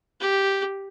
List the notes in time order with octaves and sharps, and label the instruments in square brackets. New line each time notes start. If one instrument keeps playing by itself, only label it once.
[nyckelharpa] G4